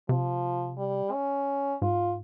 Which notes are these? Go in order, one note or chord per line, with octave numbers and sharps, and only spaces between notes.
C3 F3
G3
C#4
G#2 F4